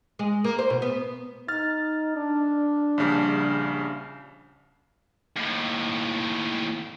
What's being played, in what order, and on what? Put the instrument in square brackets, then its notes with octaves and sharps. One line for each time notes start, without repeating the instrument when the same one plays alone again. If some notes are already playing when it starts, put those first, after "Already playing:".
[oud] G#3
A#3
C5
B2
B3
[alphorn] D#4 [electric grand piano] F6 A6
[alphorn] D4
[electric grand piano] A#1 C#3 G3
[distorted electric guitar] D#2 A2